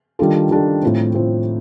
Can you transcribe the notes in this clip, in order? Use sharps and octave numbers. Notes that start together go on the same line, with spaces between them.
D#3 G3 D4 F4 A4
D#3 G3 D4 F4 A4
A2 F3 C4
A2 F3 C4